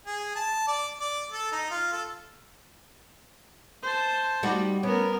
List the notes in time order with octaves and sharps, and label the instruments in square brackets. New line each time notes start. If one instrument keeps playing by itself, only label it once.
[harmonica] G#4
A5
D5
D5
A4
D#4
F4
A4
[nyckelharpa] C5 A5
[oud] G3 D#4 F#4
[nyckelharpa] B3 A#4 [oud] C#4